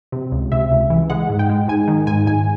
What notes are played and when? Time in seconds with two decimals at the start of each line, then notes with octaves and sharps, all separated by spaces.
0.12 C3
0.32 C#2
0.52 C3 E5
0.72 C#2
0.90 E3
1.10 G#3 F#5
1.30 G#2
1.39 G5
1.49 G#3
1.68 G#2 G#5
1.88 D#3
2.07 G#2 G#5
2.27 G#2 G#5